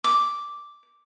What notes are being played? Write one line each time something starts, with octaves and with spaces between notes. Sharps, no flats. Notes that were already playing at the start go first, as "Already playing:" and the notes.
D6